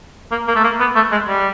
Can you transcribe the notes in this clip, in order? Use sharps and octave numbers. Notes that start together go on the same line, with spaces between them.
A#3
A#3
A3
A#3
B3
A3
G#3
G3